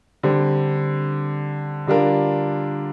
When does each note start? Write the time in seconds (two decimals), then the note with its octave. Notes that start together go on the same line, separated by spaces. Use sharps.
0.23 D3 G3 C4
1.87 D3 G3 D4 F4 A#4